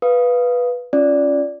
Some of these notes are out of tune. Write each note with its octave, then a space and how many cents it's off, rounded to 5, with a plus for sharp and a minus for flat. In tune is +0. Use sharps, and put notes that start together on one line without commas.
B4 -5 F5 +0 D#6 +0
C#4 +0 F4 +0 D5 -10